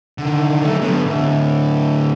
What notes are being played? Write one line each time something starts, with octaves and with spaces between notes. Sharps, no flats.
D3 D#3
F#3 A3
D3 B3
A2 D3